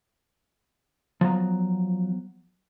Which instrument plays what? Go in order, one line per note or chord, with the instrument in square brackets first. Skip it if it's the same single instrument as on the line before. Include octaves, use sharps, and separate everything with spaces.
[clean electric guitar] F3 F#3 B3 A#5